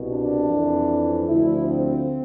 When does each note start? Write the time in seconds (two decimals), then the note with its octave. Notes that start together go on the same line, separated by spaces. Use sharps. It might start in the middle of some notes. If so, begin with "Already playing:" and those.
Already playing: C2 B2
0.09 D4
0.49 F2 E3
1.28 D2 D3 F3 E4
1.67 C4